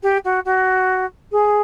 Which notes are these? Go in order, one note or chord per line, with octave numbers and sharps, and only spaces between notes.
G4
F#4
F#4
G#4